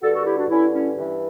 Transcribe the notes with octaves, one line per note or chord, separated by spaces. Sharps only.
G2 D3 F#4 A4
F#4 A4
E4 G4
D4 F#4
G2 D3 C#4 E4
C#4 E4
G2 E3